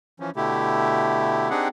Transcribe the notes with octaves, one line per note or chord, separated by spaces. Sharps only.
E3 F3 C#4
B2 D3 A3 E4 G4
C4 D4 D#4 G4 G#4 F#5